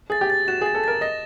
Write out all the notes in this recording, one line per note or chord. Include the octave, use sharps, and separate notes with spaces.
G#4 A6
G4
A6
F#4 E7
G#4
A6
A4
A#4 A6
D#5 A#6